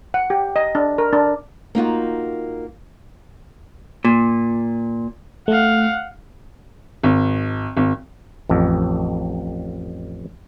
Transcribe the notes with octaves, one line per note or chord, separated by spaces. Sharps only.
F#5
G4
D#5
D4
A#4
D4
A#3 D#4 F4 F#4
A#2
A3 F5 F#5
G#1
G#1
A1 F2